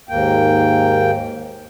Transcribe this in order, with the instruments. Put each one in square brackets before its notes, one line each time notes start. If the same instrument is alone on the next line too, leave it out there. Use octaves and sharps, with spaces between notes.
[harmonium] D#2 G#2 A#3 G5